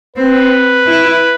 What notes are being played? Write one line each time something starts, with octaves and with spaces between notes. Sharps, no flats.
C4 B4
E4